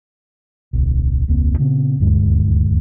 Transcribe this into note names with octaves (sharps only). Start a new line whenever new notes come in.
D1 B1
E1 C#2 A#3 C4
A#2 C#3 B3 C4
D#1 D2 G2 G#3